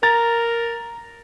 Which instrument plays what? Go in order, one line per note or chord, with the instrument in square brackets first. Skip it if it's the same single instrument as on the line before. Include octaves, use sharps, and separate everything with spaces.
[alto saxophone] A#4 [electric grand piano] A#5 A6